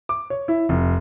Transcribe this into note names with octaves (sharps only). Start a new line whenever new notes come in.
D6
C#5
E4
F1